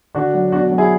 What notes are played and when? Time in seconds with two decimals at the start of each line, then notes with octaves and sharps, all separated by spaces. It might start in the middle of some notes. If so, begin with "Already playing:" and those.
0.15 D3 D4 F#4
0.34 F#3
0.52 B2 D4 F#4
0.71 F#3
0.78 E4 G#4